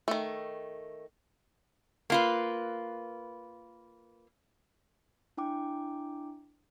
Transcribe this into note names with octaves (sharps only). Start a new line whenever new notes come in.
D#3 A3
A#3 F4 B4
D4 E4 G5 D6